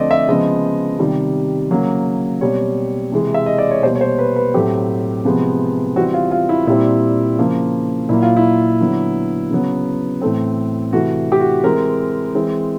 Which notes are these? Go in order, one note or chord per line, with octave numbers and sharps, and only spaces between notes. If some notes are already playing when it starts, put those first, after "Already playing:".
Already playing: D3 F3 A3 C4 D5 D#5
E5
C#3 F3 G#3 B3 D#5
C3 D#3 G3
C#3 F#3 A#3
B2 G3 C4 C#5
C3 E3 G#3
E5
D#5
D5
C#5
B2 G3 A#3 C5
C#5
C5
B4
B4
A2 F#3 A3 C4 G4
C3 F3 G#3 B3
E3 G3 C4 F#4
F4
F4
E4
A#2 G3 C4 E4
C#3 F3 A#3
A#2 F#3 A#3 E4
F4
E4
D3 F#3 B3
C#3 F#3 B3
A2 E3 A3 C4
C3 E3 A3 F#4
G4
F#4
E3 G#3 C4 A#4
E3 G#3 C4